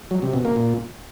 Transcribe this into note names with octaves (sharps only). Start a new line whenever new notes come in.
F#3
C3
B2
A#3
A#2